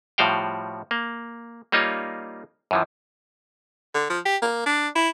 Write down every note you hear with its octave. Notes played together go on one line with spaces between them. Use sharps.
A2 F3 G3 F#4 F5 G5
A#3
G3 A#3 D#4 F4 C#5
F#2 E3 F3
D3
F3
G4
A#3
D4
E4